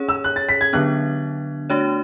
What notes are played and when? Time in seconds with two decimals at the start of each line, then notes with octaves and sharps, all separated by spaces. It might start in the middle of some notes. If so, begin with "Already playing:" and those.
Already playing: C#4 G#4 C#5
0.09 E6
0.24 F#6
0.36 A6
0.49 B6
0.61 G#6
0.73 D3 F#3 B3 D4 F#6
1.70 A3 D4 F#4 C#5